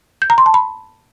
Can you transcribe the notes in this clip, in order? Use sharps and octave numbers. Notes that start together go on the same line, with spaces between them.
G6
A#5
C6
A5
B5